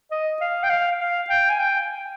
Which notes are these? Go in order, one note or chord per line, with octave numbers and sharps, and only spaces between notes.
D#5
F5
G5
F5
F5
G5
G#5
G5